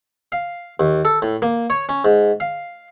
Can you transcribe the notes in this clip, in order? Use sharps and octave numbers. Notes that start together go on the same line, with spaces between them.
F5
D#2
A4
A2
A#3
C#5
C#4
G#2
F5